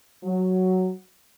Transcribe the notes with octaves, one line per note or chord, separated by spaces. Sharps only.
F#3